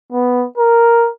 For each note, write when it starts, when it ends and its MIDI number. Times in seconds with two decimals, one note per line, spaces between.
0.12 0.45 59
0.58 1.09 70